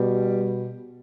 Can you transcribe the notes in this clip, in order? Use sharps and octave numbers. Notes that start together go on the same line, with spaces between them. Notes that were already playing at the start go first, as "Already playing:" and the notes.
Already playing: B2 G3